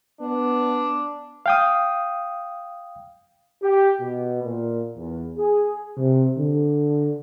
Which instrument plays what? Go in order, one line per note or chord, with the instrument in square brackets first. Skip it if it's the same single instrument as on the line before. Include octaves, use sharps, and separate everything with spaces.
[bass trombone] B3 [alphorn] D4
[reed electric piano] F5 G5 D#6
[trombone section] G4
B2
A#2
E2
G#4
[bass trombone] C3
D3